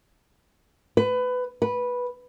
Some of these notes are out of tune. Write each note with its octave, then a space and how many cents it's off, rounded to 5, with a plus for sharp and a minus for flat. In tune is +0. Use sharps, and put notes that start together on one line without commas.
B4 +20
B4 -10